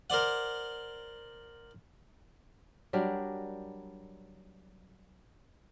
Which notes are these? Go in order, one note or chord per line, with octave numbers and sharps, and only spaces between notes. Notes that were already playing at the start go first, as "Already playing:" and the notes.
A#4 C5 D5 F#5
F#3 G3 D4 A#4